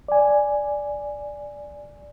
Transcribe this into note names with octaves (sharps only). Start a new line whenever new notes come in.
D5 G#5